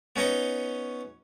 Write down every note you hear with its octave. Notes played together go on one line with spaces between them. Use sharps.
B3 C#4 D#4 D#5 C#6